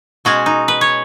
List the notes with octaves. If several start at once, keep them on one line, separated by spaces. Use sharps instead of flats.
B2 G#3 C#4 F#4
D#4
B4
C#5